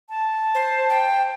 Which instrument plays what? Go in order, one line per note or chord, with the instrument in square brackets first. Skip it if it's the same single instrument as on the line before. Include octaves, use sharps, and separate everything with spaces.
[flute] A5
[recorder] C5
G5